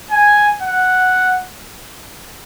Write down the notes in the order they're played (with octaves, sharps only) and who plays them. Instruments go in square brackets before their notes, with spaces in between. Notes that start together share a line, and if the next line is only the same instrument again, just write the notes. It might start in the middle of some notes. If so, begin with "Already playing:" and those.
[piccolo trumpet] G#5
F#5